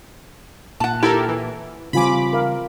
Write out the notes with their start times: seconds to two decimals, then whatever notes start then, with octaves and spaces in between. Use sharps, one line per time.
0.80 A#2 F#5 A5
1.03 E4 G4 A4 A#4
1.29 E3
1.93 C#3 E3 G3 C4 F4 G#5 B5 D6
2.33 A#4 F5